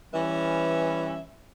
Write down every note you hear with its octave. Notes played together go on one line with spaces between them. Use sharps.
E3 G3 C#4 B4 E5